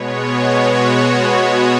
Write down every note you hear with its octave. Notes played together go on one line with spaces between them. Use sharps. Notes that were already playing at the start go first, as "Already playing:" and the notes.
Already playing: B2 G#3 B3 C#5
F#4